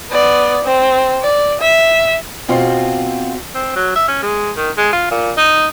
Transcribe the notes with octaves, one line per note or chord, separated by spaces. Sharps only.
B3 D5
C4
D5
E5
B2 C4 F4
C4
F#3
E5
C#4
G#3
D#3
G#3
F4
A#2
D#4